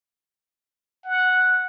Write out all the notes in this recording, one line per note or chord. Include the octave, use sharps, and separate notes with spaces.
F#5